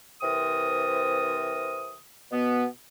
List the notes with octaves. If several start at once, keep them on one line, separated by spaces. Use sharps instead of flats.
C3 E3 C4 A#4 D#6
B2 B3